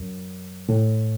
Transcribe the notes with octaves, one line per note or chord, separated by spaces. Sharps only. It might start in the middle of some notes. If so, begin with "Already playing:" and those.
Already playing: F#2
A2